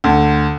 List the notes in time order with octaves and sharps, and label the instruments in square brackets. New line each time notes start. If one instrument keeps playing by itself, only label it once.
[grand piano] D2